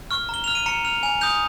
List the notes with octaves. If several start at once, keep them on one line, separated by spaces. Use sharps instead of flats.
C#6 F6
A#5 G7
F6 F7
D#7
A#5 C#7
F6 F7
G#5 F7
D#6 G6 F7